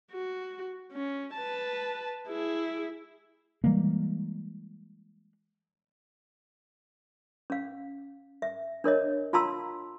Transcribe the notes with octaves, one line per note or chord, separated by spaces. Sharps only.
F#4
C#4
B4 A5
E4 G#4
E3 G3 G#3 A#3
C#4 F5
E5
D4 A#4 C#5 D#5
F4 F5 A5 A#5 C6 E6